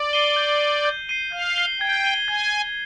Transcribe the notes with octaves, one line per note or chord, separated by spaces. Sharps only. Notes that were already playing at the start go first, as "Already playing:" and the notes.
Already playing: D5
C7 D#7 G7
G6
C7 D#7 G7
G6
C7 D#7 G7
F5 G6
C7 D#7 G7
G5 G#6
D#7 G7
G#5 G#6
D#7 G7